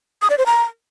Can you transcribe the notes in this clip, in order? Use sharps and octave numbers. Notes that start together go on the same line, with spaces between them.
D#6
D5
C5
A#5